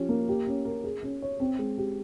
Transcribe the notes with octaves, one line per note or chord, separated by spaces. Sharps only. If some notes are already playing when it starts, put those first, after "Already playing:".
Already playing: F3 C#4 G4
A#3
G4
C#4
A#4
G#4
C#4
C#5
C4
G#3
G4